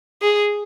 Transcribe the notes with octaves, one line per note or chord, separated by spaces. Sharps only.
G#4